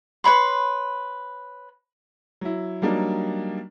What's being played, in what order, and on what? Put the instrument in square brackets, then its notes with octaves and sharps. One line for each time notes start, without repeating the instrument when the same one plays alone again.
[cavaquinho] B4 C#5 B5 C6
[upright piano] F#3 E4
F#3 G3 A#3 D4 D#4